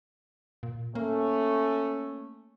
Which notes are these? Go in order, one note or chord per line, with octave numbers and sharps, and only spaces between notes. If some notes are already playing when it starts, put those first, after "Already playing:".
A#2
A3 A#3 C#4